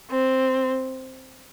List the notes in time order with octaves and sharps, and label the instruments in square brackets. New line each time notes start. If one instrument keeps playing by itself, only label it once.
[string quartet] C4